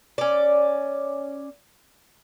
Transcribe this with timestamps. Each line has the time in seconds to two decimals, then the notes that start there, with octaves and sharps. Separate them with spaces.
0.18 C#4 D5